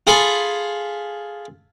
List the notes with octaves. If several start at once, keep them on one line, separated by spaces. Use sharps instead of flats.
F4 G#4 A4 G#5 B5